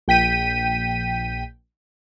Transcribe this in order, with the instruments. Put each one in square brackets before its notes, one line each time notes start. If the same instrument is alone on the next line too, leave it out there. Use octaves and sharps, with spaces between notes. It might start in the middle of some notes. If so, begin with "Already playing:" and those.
[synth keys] A#1 G5 B6 D#7